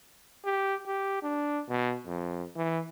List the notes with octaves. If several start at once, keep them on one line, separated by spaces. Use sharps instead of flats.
G4
G4
D4
B2
F2
E3